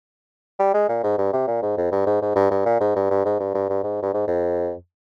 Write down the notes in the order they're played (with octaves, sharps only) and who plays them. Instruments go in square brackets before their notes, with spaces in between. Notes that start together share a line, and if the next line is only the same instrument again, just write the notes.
[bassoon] G3
G#3
A#2
G#2
G2
C3
A#2
G#2
F2
G2
G#2
G#2
G2
G2
A#2
G#2
G2
G2
G#2
G2
G2
G2
G#2
G2
G#2
F2